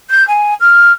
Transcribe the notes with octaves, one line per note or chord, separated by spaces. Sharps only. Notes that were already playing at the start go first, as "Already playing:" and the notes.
G6
G#5
F6